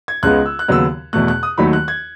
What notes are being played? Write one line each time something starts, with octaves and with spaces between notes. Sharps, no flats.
G#6
C#2 C#3 G#3 B3 F#6
E6
F#6
D#2 C#3 F#3 B3 E6
E2 B2 A3 F#6
F#6
D#6
D#2 D#3 F#3 A3 B5
F#6
G#6